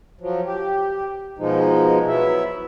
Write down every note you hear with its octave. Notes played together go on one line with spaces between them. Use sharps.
F3 F#3
G4
B2 F3 G#3 D#4
F#3 B3 E4 E5